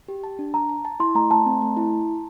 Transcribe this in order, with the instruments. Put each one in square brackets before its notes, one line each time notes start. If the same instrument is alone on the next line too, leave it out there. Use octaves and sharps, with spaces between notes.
[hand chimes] G4
A5
D4
[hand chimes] A5 [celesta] A#5
[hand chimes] A5
A5
[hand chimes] E4 [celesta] C6
[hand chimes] A3 [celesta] A#5
[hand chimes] A3 [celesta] A5
[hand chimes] C4
A3
E4